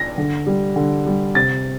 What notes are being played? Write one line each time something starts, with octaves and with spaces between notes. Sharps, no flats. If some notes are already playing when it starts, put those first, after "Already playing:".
Already playing: A#6
D3
G3
D3
G3
C3 A6